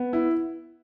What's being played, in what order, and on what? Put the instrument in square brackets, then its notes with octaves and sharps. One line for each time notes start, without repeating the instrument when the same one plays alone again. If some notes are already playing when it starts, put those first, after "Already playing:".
Already playing: [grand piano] B3
E4